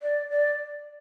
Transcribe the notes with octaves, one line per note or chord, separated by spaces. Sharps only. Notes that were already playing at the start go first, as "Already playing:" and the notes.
D5
D5